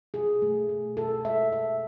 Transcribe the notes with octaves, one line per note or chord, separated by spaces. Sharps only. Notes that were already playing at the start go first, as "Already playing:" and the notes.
B2 G#4
A3
B2
B2 A4
G#3 E5
B2 E5